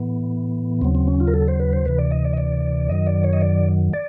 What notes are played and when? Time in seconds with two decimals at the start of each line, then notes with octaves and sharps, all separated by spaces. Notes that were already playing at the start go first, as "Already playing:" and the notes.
Already playing: A2 E3 B3
0.82 D#2 C#3 F#3 C4
0.95 C4
1.08 C#4
1.20 F4
1.28 A#4
1.34 A4
1.48 C5
1.60 B4
1.73 C5
1.86 D2 C3 E3 B4
1.98 D5
2.11 D#5
2.25 D5
2.33 D#5
2.37 D5
2.89 F#2 D#3 F#3 D#5
3.07 D5
3.24 C#5
3.33 D#5
3.41 D5
3.93 D5